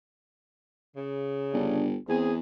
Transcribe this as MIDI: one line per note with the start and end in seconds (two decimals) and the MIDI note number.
0.97 1.84 49
1.53 1.97 31
1.53 1.88 62
2.09 2.40 40
2.09 2.34 60
2.09 2.32 68